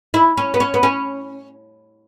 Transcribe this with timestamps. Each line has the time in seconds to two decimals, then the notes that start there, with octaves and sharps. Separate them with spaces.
0.14 E4
0.37 C#4
0.54 B3
0.60 C#4
0.74 B3
0.83 C#4